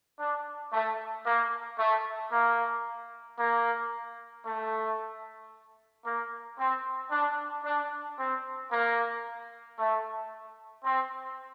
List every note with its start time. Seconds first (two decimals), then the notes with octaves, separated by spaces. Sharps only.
0.19 D4
0.73 A3
1.26 A#3
1.79 A3
2.32 A#3
3.39 A#3
4.45 A3
6.05 A#3
6.58 C4
7.11 D4
7.64 D4
8.18 C4
8.72 A#3
9.78 A3
10.84 C4